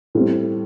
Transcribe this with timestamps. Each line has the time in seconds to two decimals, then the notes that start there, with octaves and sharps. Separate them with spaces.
0.15 A2 G3 C4